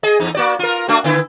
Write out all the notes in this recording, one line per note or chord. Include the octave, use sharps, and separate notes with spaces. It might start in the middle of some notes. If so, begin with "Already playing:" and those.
G#4 D#5
E2 D#4
A#3 F#4 D5
F4 A#4
A3 D4 F#4
D3 B3 E4